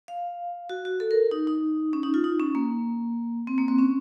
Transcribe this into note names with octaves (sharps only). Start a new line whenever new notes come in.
F5
F#4
F#4
A4
A#4
D#4
D#4
C#4
D#4
F4
D#4
C#4
A#3
C4
A#3
C4
C#4